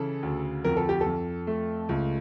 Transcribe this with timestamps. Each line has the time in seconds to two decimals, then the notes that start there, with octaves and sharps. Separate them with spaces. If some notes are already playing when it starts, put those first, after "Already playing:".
Already playing: C#3 E3 A4
0.23 D2
0.65 F2 A#4
0.77 A4
0.89 G4
1.01 A4
1.06 F2
1.47 A3
1.89 C#2